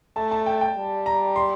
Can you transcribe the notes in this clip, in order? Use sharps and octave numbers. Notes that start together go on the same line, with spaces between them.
A3 A5
A5
G5
G5
G3
A#5
C6